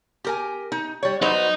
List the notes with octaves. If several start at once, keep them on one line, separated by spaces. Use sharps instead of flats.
G4 A#4 G#5
D#4
G3 C#5
F#3 D#4 B4 C5 D#5